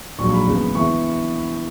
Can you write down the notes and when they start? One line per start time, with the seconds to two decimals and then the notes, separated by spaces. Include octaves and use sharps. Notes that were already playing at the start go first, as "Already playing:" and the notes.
0.18 A#1 G#2 F#3 A#3 C#6
0.33 B5
0.47 E2 C#3 G#3 B3
0.75 E3 B3 C#6